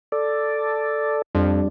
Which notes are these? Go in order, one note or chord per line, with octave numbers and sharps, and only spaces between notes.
A4 D5
F2 G3 D4